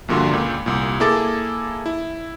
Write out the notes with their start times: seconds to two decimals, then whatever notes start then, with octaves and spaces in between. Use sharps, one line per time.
0.08 A#1 G2 A#2 D3 F#4 C6
0.31 C#2 A#2
0.66 C2 A#2
1.00 A#3 E4 G#4 A4 D6 A6
1.86 E4